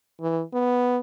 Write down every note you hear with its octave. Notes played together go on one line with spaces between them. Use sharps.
E3
B3